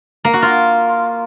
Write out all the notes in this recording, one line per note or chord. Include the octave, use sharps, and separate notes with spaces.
A#3
F#4
F4